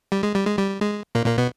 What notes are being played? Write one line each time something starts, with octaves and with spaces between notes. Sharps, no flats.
G3
G#3
G3
G#3
G3
G#3
A#2 A#3
A#2 A#3
B2 B3